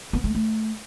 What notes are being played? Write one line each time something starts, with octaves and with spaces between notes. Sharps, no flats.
B3
A3
A3